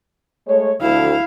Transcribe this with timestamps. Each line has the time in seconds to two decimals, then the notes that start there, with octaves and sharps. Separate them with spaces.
0.47 G#3 A3 C#5
0.82 D2 E4 F5